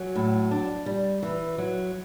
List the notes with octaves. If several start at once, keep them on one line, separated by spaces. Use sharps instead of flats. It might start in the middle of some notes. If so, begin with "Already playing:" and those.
Already playing: F#3 C#4
A2
D4
G3
E3
F#3